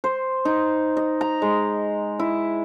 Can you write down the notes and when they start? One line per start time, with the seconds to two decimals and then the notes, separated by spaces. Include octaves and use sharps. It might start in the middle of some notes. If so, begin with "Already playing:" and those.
0.04 C5
0.45 D#4
0.97 D#5
1.21 A#5
1.42 G#3
2.19 E4